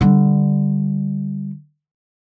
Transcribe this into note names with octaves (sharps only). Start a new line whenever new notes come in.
D3 G3